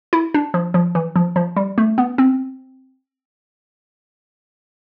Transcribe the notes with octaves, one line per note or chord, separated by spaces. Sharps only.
E4
D4
F3
F3
E3
F3
F3
G3
A3
B3
C4